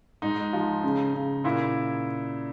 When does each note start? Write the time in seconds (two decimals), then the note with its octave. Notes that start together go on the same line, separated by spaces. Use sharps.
0.22 G#2 D#4
0.53 F3
0.83 C#3
1.14 C#3
1.44 A#2 E4